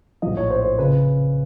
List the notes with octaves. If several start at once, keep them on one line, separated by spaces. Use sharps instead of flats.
A#1 A2 F3 D#5
C#5
C5
C5
C#3 B4